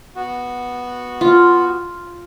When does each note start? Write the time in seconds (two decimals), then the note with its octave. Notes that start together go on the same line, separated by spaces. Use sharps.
0.16 B3 F#4
1.21 F4